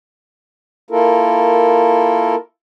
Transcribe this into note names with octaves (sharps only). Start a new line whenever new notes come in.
A#3 E4 F4 A4 A#4